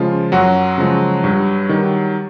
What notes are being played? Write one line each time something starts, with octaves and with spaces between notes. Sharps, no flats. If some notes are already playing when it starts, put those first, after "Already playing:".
Already playing: C#3 F3 G#3 F4
F#2 F#3 F#4
C#3 F3 G#3
G2
D#3 G3